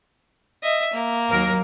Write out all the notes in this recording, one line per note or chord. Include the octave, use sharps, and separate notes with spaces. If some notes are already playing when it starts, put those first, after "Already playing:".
D#5 E5
A#3
D#2 F#3 A#4